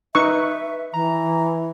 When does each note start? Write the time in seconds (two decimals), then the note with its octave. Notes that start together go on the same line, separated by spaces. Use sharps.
0.15 D#4 B4 E5 C#6
0.94 E3 A#5